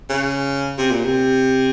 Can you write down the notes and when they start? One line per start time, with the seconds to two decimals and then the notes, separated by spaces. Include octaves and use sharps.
0.10 C#3
0.78 C3
0.91 A#2
1.05 C3